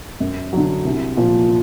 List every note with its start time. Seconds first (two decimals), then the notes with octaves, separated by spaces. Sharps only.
0.20 F#2
0.53 D3 F#3
0.85 C2
1.17 A#2 F3